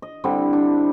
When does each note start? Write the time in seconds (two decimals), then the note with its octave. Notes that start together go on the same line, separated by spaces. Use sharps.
0.02 D#5
0.24 D3 G3 C4 E4
0.53 D4